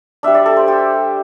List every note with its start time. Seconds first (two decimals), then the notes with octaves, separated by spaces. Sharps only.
0.23 G3 D4 E5
0.34 D5
0.46 A4
0.57 C5
0.68 G4